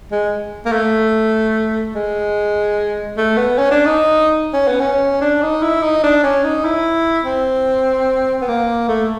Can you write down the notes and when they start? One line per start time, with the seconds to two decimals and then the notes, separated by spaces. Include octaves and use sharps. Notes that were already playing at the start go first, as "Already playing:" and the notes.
0.12 G#3
0.66 A#3
0.72 A3
1.95 G#3
3.18 A3
3.37 B3
3.58 C#4
3.71 D4
3.86 D#4
4.54 C#4
4.68 B3
4.81 C#4
5.21 D4
5.43 D#4
5.63 E4
5.83 D#4
6.04 D4
6.24 C#4
6.44 D#4
6.65 E4
7.25 C4
8.42 B3
8.48 A#3
8.88 A3